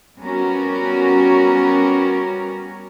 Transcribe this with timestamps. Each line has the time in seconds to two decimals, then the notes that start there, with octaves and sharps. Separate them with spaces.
0.20 G3 B3 C#4 F#4 A#4